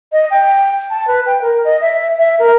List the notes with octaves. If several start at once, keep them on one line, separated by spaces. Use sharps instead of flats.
D#5
G5
A5
B4
G5
A#4
D#5
E5
E5
A#4